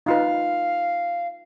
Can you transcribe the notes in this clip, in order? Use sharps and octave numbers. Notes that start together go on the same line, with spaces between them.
D#4 F4 B4 F5